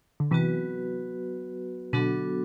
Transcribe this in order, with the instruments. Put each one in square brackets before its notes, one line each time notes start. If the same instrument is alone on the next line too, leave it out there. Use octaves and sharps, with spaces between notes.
[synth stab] D3
[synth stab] C3 E3 [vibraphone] F#3 B3 F#4 B4
[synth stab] B2 D3 [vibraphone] F#3 B3 D4 F#4 A4